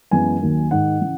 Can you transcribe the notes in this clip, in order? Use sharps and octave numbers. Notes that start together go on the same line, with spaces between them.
F#2 E3 G#3 B3 G#5
D#2 D#3 F#3 A#3
G#2 D#3 G#3 F#5
C#3 E3